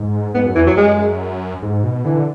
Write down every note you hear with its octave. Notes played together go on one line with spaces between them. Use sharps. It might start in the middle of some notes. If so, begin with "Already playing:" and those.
Already playing: G#2
G#2 B3
F#2
E2 E3
F#2 F#3
G#3
G#2
B2
D3 E3